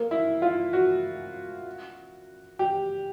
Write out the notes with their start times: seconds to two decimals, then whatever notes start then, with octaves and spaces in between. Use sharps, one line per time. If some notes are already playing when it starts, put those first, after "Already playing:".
Already playing: A#3
0.11 E4
0.42 F4
0.73 F#4
2.59 G4